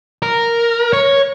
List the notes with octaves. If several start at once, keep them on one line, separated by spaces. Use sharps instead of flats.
A#4
C#5